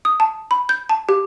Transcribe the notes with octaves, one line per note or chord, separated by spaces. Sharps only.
D#6
A5
B5
G6
A5
G4